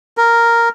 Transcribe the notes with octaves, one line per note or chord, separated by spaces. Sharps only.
A#4